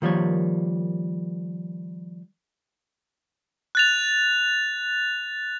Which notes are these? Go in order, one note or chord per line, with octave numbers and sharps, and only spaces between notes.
D#3 F3 G3 A#3 C#5
F#6 A6 F7